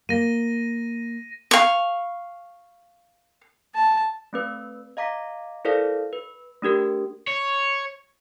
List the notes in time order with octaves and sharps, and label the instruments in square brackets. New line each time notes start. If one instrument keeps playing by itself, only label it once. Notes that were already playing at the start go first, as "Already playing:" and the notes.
[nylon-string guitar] A#3 [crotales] A#6 D#7
[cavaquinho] F5 C#6
[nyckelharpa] A5
[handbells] A3 C4 B4
D#5 F5 A#5 D6 B6
E4 A4 A#4 C5 D5 F5
B4
A3 D4 G4 A#4
[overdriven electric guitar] C#5